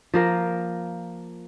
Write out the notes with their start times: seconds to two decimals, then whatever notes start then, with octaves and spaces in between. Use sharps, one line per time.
0.14 F3 A#3 A#4